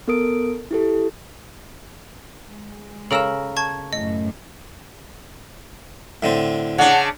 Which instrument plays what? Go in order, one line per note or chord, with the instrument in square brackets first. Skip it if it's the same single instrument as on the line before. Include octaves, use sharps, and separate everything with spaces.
[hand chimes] B3 A4 A#4 D#6 D7
E4 G4 A4
[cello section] G#3
[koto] C#3 A#4 A#5 [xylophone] A4 E6 E7
[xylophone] A5 C#6 G#6
[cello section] F#2 A2 [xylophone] D#5
[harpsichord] A2 D3 C4
[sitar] C#3 D4 [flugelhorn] F#5